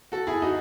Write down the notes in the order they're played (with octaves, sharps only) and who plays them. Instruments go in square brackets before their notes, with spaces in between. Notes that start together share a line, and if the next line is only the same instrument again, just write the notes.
[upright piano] F#4 A4
E4 G#4
D#4 F#4